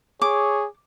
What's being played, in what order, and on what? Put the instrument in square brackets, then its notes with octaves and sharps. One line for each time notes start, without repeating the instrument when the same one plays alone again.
[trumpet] G#4 [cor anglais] C#5 [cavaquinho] D6